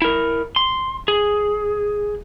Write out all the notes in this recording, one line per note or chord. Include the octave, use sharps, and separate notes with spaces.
E4 A#4
C6
G#4